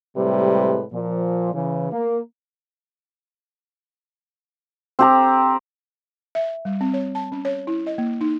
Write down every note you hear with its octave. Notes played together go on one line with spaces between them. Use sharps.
A2 C3 G3 G#3 B4
A#2 F3
C#3 E3
A#3
C4 G4 A#5
E5
G3
C4
C#5
A5
C#4
C#5
E4
D#5
A#3
D#4